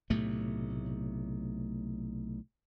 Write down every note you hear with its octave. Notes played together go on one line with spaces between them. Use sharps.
B1 A2 C3 A3